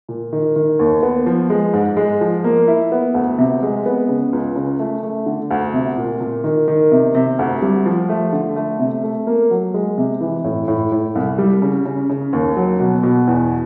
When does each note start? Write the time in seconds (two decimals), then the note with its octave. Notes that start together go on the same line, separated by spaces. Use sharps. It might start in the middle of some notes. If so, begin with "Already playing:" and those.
0.09 A#2
0.33 D#3
0.56 D#3
0.79 D#2
1.03 B3
1.26 F3
1.50 G#3
1.73 G#2
1.97 G#3
2.21 F3
2.44 A#3
2.68 E4
2.92 B3
3.14 D2
3.39 C3
3.62 G#3
3.86 B3
4.09 C#3
4.33 C#2
4.56 C#3
4.79 A3
5.03 A3
5.26 D3
5.51 D2
5.73 C3
5.97 A#2
6.21 A#2
6.44 D#3
6.68 D#3
6.92 C3
7.15 C3
7.39 D2
7.62 G3
7.86 F3
8.09 A3
8.33 D3
8.56 A3
8.79 C3
9.04 A3
9.27 A#3
9.51 F#3
9.74 G#3
9.98 C3
10.21 E3
10.44 A2
10.68 A2
10.92 A2
11.15 C2
11.38 G3
11.62 C#3
11.85 C#3
12.10 C#3
12.33 D#2
12.56 F#3
12.80 B2
13.03 B2
13.28 E2